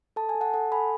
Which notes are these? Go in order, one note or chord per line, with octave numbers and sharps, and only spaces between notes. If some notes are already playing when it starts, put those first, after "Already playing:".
A4 A5
G#5
A4
F#5 A5
A4 F#5 A5
A4 G#5 B5